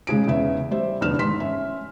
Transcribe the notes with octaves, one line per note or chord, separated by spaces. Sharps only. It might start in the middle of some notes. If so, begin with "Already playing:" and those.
C#3 G#3 G#4 D7
E2 C#3 E5
G3 C5 E5
F1 E2 D3 F6 E7
G#2 D#3 C6 B6
C#4 E5